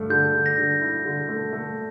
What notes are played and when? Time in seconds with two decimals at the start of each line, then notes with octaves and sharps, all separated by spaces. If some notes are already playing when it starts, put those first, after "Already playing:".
Already playing: G2 A3
0.10 D3 G6
0.34 D3
0.46 A#6
0.58 D3
0.81 E4
1.05 D3
1.29 A3
1.53 A3